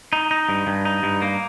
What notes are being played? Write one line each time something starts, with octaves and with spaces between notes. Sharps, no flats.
D#4
D#4
G2
G2
D#4
G2
A#3